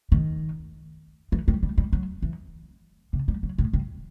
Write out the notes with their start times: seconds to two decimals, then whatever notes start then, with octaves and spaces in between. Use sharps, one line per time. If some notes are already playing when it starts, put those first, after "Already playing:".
0.12 D#3
1.32 E3
1.48 G3
1.63 G3
1.78 G3
1.93 F#3
2.22 E3
3.13 C3
3.28 G3
3.43 F#3
3.58 A2
3.73 G2